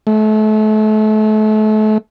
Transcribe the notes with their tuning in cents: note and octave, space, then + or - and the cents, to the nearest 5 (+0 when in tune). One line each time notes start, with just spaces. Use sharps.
A3 -35